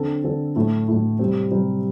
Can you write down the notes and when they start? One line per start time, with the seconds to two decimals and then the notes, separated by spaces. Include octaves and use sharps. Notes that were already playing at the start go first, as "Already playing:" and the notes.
Already playing: D3 C4 A4
0.24 D3 C4 A4
0.56 A2 A3 E4
0.88 A2 A3 E4
1.19 C3 G3 C4
1.51 C3 G3 C4